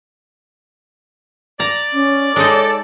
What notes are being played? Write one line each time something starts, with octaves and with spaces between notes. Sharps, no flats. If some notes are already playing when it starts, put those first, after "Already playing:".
D5 A#5
C#4
G#3 D#4 A4 C#5